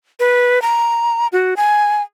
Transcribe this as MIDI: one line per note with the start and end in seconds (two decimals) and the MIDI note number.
0.20 0.62 71
0.62 1.27 82
1.32 1.54 66
1.57 2.02 80